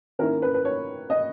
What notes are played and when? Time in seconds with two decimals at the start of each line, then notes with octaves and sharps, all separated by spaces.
0.19 D#3 A#3 C#4 E4 A#4
0.42 B4
0.54 B4
0.65 C#5
1.10 D#5